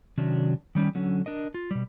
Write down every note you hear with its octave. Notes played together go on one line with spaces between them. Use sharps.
C3 D#3 F#3 C#4 D4 F#4
D#3 G3 C#4
D3 F#3 C#4
D4 A#4 D#5
F4
B2 G3